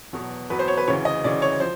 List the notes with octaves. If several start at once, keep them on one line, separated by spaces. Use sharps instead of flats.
E2 B2 F#3
E2 B2 F#3 B4
C5
C#5
B4
D2 C#3 E3 C#5
D#5
D2 C#3 E3 D5
C#5
F3 C5